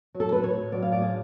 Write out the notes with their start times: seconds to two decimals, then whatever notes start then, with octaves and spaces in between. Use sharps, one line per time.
0.14 F#3
0.20 A4
0.32 A2 B4
0.43 C#5
0.54 A2
0.72 F#3 D5
0.82 F5
0.92 A2 D5
1.02 G#4